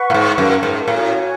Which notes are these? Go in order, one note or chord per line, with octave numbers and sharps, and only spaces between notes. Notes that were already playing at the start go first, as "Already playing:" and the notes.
Already playing: B4 F#5 C#6
A2
G#2
F#2
G#2
A2 F#4 C#5 G#5